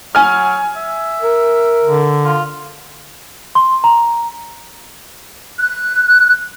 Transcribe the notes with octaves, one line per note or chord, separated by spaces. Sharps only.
F#3 G#5 F6
E5
A#4
D3
F4
C6
A#5
F#6